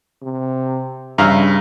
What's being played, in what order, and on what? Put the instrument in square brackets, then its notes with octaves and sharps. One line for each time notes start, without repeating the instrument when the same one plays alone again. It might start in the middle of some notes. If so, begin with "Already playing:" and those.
[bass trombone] C3
[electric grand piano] G2 [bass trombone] C#3 [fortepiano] E5 F5 A#5